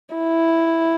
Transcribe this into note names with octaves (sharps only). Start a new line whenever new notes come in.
E4